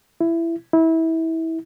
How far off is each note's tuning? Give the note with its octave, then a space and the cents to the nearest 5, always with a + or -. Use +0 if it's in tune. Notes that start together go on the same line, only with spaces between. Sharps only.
E4 +15
E4 -25